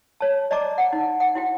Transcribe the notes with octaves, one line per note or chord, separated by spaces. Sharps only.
C#5 A5
D5 D#5 A5 A#5 D6
F#5
D#4
F#5
E4 F#4 G5